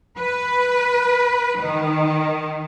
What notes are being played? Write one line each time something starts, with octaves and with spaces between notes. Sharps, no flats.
B4
D#3